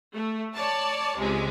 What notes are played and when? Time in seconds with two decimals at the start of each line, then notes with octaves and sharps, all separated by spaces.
0.14 A3
0.55 C#5 D5 A5
1.17 C#2 C3 G#3